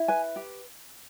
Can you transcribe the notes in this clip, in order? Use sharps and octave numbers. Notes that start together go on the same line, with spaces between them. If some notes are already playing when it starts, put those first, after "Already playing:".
Already playing: E4
B4 G#5
G4